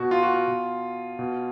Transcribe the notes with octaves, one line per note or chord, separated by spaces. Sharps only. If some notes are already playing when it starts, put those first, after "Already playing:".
Already playing: B2 F#4
F4
F#4
F4
B2
B2